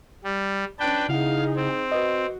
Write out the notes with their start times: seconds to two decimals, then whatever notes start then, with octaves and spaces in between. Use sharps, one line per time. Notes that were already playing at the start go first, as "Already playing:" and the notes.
0.24 G3
0.79 C#4 D4 B4 G5 A5
1.09 C#3 D#4 E4 G#4 F5 F#5
1.56 C4
1.92 F#4 B4 D#5